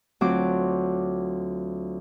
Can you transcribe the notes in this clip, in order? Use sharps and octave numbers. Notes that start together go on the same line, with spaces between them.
D2 F#3 C4 F4 D6